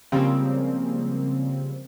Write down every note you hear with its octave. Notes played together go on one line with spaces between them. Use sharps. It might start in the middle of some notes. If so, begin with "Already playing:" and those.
C#3 F3 G3 G#3 A#3 C4